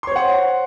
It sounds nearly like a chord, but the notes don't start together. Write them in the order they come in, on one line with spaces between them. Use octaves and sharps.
C6 C#5 C5 F#5